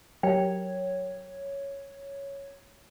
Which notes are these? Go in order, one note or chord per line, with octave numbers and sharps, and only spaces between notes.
F#3 G4 A#4 C#5 G5